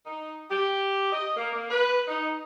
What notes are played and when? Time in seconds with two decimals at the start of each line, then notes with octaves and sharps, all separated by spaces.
0.06 D#4
0.49 G4
1.12 D#5
1.36 A#3
1.52 A#3
1.69 B4
2.07 D#4